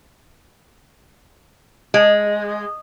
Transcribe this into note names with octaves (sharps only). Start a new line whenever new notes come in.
G#3